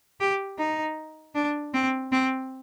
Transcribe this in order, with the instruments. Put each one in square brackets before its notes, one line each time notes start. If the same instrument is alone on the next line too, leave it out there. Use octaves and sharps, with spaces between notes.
[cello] G4
D#4
D4
C4
C4